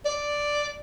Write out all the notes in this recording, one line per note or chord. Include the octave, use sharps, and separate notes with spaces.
D5